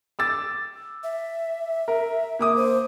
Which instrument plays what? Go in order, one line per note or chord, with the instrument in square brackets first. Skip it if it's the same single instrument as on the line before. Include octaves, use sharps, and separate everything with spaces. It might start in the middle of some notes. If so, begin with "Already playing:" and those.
[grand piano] D6 E6 A6
[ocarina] E5
[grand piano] A#4
A#3 D6 D#6
[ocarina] C5